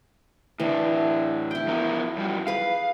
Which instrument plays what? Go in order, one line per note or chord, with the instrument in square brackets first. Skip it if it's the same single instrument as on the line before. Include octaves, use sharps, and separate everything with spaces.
[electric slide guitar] A2 D4 [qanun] E3
[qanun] E4 G5
[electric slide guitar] F3 B3 A#4
F#2 F3 G3
[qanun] G#4 B4 [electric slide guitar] F5